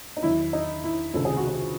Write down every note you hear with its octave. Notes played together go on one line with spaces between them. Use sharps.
D#4
E2 D#3 F#3 E4
D#4
E4
C#2 C3 D#3 A4
G#4
F#4
G#4